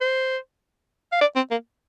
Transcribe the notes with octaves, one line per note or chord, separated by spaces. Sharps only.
C5
F5
D5
C4
A#3